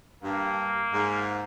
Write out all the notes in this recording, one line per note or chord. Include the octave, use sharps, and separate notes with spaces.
G2 A#3
G#2